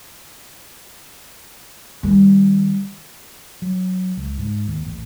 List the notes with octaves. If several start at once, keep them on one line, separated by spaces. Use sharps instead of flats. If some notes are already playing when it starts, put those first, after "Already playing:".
D#3 G3
F#3
C#2
G#2
D#2
A1